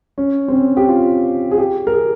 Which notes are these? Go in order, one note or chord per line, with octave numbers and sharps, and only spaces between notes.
C#4
C4
C#4
G4
F4
G#4
G4
A#4
G#4